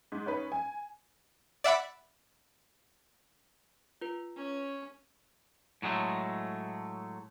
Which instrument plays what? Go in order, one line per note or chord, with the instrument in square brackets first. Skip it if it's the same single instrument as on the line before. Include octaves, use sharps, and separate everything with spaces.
[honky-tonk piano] G#2
C#4 D#4 B4
G#5
[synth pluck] D5 E5 F#5 B5
[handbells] F4 B4
[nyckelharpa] C#4
[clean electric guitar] A2 F#3 G#3 A3